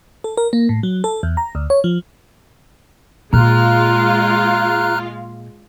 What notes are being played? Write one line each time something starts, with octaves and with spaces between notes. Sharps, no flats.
A4
A#4
A#3
A2
F#3
A4
E2
A#5
D2
C#5
F3
A#2 G#3 F4 F5 A#5 F6 F#6